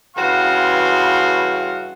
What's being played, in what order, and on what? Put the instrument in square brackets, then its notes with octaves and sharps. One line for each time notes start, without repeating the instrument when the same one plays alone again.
[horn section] G2 C#3 E3 F#4 F5 C6